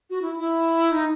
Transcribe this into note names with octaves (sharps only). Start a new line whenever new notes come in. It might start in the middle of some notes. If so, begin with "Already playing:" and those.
F#4
E4
E4
D#4